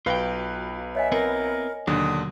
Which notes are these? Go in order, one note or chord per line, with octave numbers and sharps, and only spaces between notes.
B1 F4 F#4 B4 F5 G5
C#5 D#5 E5 G#5
B3 C4 E4 A#4
D#2 B2 D3 F#3 D4 D#6